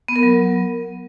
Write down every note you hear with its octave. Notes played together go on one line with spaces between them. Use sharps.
B3
A#4
F#3